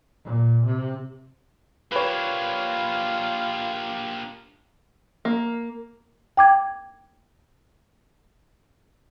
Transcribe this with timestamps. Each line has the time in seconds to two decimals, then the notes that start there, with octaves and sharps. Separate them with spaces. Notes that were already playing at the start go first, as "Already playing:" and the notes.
0.24 A#2
0.66 C3
1.92 A#3 D4 F4 G4 B4 C#5
5.25 A#3
6.37 G5 D6 G#6